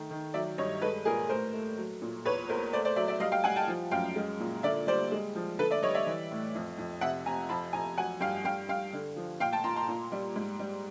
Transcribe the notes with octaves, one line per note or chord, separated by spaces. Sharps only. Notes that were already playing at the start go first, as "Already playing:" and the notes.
Already playing: D#3 A3
D#3
F#3 D5 E5
G2 C#5 D#5
G#3 A4 B4
A#2 G#4 A#4
A2 A#4 C5
A3
F#3
A#2
E2 B4 C#5
E2 A#4 C5
A3 C5 D5
C5 D5
F#3 D5 E5
D5 E5
G3 D#5 F5
F5 G5
G3 F#5 G#5
G5 A5
F3
F#2 F5 G5
G#3
A#2
D3 D5 E5
G3 C5 D5
G#3
F3
D3 A4 B4
D5 E5
G3 C#5 D#5
D5 E5
E3
A2
F2
F2
C3 E5 F#5
C3 G#5 A#5
F2 A5 B5
F2 G#5 A#5
F#3 F#5 G#5
G2 F5 G5
G2 F5 G5
G2 F5 G5
D3
F3
A#2 F5 G5
G5 A5
A#2 A#5 C6
A#5 C6
A#2
G3
G#2
G3